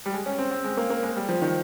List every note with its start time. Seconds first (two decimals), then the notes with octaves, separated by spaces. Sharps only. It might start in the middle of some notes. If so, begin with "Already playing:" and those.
0.06 G3
0.13 G#3
0.26 C#4
0.39 C4
0.51 C4
0.64 G#3
0.77 A#3
0.90 A#3
1.03 G#3
1.16 G3
1.29 F3
1.42 D#3